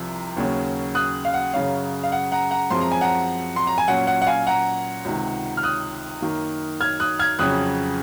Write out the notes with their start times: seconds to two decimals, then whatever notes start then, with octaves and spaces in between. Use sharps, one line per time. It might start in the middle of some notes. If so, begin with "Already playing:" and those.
Already playing: C2 C3 F3
0.37 D#2 C#3 F#3 C#4
0.95 D#6 F#6
1.25 F5
1.34 F#5
1.53 F#2 C#3 F#3 C#4 F5
2.03 F5
2.12 F#5
2.32 F#5 A#5
2.51 F#5 A#5
2.70 F#2 F3 G#3 C4 C6
2.81 A#5
2.91 G#5
3.01 F#5 A#5
3.56 C6
3.67 A#5
3.78 G#5
3.88 A#2 F#3 C#4 F#5
4.07 F#5
4.22 F#5
4.27 F5 G#5
4.47 F#5 A#5
5.05 C#2 C3 D#3
5.57 F6
5.63 D#6 F#6
6.22 F#2 D#3 A#3
6.81 F6 G#6
7.00 D#6 F#6
7.19 F6 G#6
7.39 F2 C#3 F#3 C#4 D#6 F#6